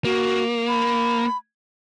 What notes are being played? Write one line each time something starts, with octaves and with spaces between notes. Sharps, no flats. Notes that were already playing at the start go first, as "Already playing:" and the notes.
A#3 F#4
B5